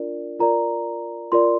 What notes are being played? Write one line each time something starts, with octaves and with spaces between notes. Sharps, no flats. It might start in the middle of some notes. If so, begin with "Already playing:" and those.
Already playing: D4 F4 A#4 D5
F4 A#4 D5 A#5
F4 A#4 D5 C6